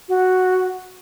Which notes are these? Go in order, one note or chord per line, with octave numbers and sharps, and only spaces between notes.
F#4